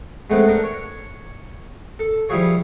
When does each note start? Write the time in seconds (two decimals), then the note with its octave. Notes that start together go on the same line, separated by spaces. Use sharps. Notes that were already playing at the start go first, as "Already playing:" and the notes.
0.30 G#3 A3 B3 C4
0.48 D4 A4 A#4
0.64 C#5
1.99 A4
2.29 F3 G3 E4 F4 G#4 C#5